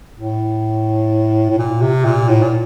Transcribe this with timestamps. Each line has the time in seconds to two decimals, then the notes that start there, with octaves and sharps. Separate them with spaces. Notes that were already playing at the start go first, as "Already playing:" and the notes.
0.19 A2
1.50 A2
1.59 A#2
1.81 C3
2.05 A#2
2.29 A2
2.42 A#2